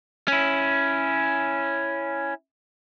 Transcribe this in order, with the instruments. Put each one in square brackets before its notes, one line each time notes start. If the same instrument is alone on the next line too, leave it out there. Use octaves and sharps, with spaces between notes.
[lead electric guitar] C#4 E4